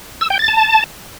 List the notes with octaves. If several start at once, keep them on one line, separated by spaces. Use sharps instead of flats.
E6
G5
A6
A5